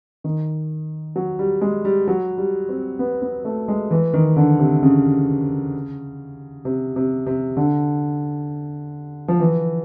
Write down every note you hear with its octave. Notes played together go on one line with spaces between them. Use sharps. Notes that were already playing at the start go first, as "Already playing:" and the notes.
D#3
F#3
G3
G#3
G3
F#3
G3
C4
B3
B3
A3
G#3
E3
D#3
D3
C3
C#3
C3
C3
C3
D3
F3
E3